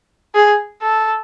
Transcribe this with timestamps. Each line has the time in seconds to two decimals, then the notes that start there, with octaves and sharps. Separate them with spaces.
0.35 G#4
0.82 A4